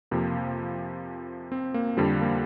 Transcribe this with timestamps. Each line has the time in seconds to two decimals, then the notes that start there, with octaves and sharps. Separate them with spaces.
0.11 F2 C3 F3 A#3
1.52 C4
1.74 A#3
1.97 F2 D3 F3 G3
2.21 A#3